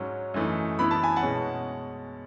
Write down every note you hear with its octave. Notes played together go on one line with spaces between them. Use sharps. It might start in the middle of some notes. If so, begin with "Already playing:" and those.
Already playing: G#2 F#3 C#4
F#2 E3 A3 D#4
F#2 E3 B3 E4 B5
A5
G#5
F#5 A5
B2 G#3 C#4